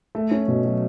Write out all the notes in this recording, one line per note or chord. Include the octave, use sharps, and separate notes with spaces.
A3
C#4
B2
F#3